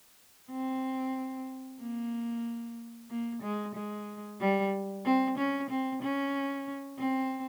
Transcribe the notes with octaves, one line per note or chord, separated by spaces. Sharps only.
C4
A#3
A#3
G#3
G#3
G3
C4
C#4
C4
C#4
C4